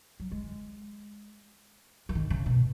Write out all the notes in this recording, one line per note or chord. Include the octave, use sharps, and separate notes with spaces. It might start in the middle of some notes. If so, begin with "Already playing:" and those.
F#3
G#3
E3
D#3
C#3
B2